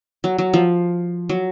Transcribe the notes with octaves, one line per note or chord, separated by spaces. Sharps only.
F#3
F#3
F3
F#3